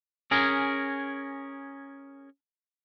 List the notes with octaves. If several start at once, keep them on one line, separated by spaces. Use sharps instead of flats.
C#4 G#4 A#4